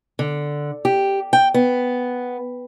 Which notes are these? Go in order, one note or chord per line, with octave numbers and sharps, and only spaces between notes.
D3
G4
G5
B3